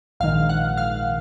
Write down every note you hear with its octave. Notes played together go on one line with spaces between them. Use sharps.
A#1 G#2 D#3 F5
F#5
F5